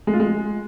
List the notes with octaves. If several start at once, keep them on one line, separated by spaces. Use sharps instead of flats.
G#3
F4
G#3